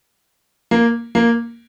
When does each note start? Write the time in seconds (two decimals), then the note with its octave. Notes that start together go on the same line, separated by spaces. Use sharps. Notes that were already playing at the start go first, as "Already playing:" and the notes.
0.71 A#3
1.15 A#3